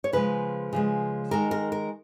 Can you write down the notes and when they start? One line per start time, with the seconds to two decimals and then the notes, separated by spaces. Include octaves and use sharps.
0.04 C#5
0.13 C#3 F3 G#3 B4
0.73 C#3 F3 G#3
1.31 D#3 G#3 A#4
1.51 A#4
1.72 A#4